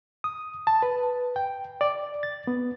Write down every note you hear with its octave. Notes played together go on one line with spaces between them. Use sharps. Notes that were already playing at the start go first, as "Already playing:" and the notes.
D#6
A5
B4
G5
D5
A6
B3